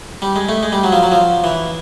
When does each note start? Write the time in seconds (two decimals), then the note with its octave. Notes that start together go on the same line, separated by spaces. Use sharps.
0.22 G3
0.36 G#3
0.49 A3
0.63 G#3
0.72 G3
0.84 F#3
0.92 F3
1.03 F#3
1.12 F3
1.44 E3